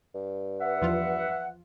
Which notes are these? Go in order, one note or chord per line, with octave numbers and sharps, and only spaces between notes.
G2
B4 E5 F#5
E2 F3 F4